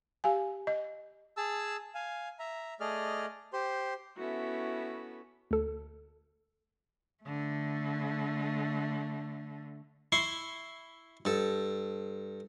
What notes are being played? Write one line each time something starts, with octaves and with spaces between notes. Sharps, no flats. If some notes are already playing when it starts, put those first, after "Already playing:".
G4 F5 G#5
D#5
G#4 A5 E6
F5 G#5
E5 A#5
A3 G#4 D5 D#5 F6
G4 C5 C6
B3 C#4 E4 F#4 A4 E5
D2 A4
D3 A3
E4 C6 C#6
G2 A4